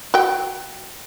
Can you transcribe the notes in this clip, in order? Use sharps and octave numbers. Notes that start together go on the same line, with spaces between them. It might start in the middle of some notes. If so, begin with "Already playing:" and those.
F#4 G5